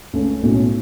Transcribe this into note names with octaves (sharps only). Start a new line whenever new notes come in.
C#2 C#3 A3 C#4
B1 A2 A3 C#4